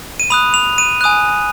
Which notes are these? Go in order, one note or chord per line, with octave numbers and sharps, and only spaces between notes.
D#7
B5 D#6 F#6 F7
F7
D#7
G#5 D#6 F#6